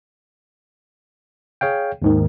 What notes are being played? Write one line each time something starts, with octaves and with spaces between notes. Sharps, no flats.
G#4 C#5 F5 G5
D#2 G#2 D#3